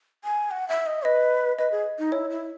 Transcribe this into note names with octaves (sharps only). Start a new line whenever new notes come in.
G#5
F#5
E5
D#5
B4 D#5
B4 D#5
G#4
D#4
E4 C#5
E4